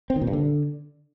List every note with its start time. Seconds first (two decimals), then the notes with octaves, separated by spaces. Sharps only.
0.10 C4
0.16 D#3
0.22 A#2
0.27 G2
0.33 D3